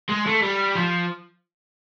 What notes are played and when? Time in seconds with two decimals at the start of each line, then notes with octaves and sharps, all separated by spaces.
0.09 G#3
0.26 A3
0.42 G3
0.75 F3